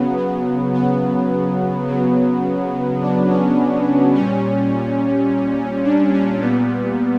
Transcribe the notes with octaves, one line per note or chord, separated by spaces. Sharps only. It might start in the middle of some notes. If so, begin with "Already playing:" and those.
Already playing: C#3 F#3 B3
B3
B3
C#3 F#3
D4
C#4
A#2 G3 C#4
D4
C#4
A#2 G3 B3